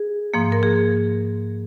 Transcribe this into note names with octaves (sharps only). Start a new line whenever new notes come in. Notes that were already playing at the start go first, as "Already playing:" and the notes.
Already playing: G#4
G#2 F3 A#3
A#4
G#4